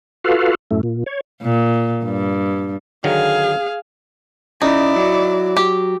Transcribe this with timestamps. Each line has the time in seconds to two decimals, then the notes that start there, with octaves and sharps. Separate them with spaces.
0.24 F4 F#4 A4 B4 F5
0.71 F#2 A2 A3
0.83 A#2
1.06 C#5
1.42 A#2
2.04 G2
3.04 D3 D#3 F#3 G#4 F5
4.62 C#3 D#4 E4 D5
4.96 F#3
5.57 G4